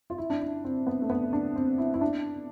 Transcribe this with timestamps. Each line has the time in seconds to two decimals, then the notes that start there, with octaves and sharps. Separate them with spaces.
0.10 F4
0.18 E4
0.30 D4
0.41 E4
0.65 C4
0.87 B3
1.02 A3
1.10 B3
1.33 D4
1.56 C4
1.78 E4
1.94 E4
2.01 D4